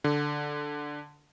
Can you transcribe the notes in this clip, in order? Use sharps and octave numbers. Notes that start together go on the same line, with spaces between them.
D3